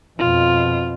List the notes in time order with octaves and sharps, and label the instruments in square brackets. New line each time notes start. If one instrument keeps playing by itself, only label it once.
[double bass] F2 B2 [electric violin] F4